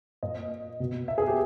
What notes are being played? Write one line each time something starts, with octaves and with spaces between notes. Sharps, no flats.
A#2 D#5
B2
E5
G#4
G4